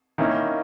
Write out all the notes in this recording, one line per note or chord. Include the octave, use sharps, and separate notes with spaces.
D#3 A#3 C#4 E4